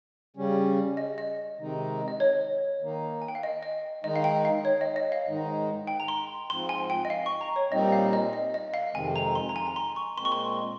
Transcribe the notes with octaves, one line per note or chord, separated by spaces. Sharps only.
C#3 G3 C#4
D#5
D#5
C3 D#3 G#3 D#4
D#5
C#5
D#3 A#3 D#4
G#5
G5
F5
D#5
D#5
D#3 G#3 D#4 D#5
F5
G5
F5
C#5
D#5
D#5
F5
G#2 D#3 G#3 D#4
G5
A#5
C6
G#2 F3 C4 C6
G#5
G5
D#5
F5
C#6
A#5
C#5
A#2 G3 C4 D#4 D#5
F5
D#5
D#5
D#5
F5
F2 C3 D#3 G#3 C4 G#5
A#5
C6
A#5
G#5
A#5
C6
C#6
A#2 G#3 C4 C6
C#6
C6